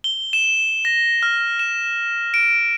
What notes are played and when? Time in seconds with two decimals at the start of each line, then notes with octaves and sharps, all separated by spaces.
0.04 G7
0.33 E7
0.85 A#6
1.23 F6
1.59 E7
2.34 D7